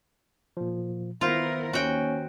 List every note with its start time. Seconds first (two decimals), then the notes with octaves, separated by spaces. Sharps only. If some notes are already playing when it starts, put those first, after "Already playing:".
0.57 A#2 F3
1.21 D#3 B3 E4 F4 A#4 C5
1.73 D#2 C#4 F#4 G5